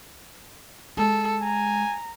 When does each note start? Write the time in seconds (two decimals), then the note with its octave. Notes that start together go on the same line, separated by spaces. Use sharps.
0.97 G#3 A4
1.42 G#5 A#5